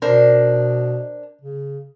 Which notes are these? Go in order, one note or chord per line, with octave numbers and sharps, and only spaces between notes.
B2 D4 A#4 C5
C#3